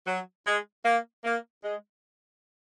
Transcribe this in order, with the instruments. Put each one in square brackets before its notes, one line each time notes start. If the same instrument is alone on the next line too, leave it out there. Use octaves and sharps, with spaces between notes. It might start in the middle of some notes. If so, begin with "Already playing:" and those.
[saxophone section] F#3
G#3
A#3
A#3
G#3